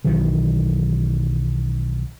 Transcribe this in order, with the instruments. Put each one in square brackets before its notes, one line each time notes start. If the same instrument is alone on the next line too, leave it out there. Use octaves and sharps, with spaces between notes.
[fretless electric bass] B1 D#3 E3 F#3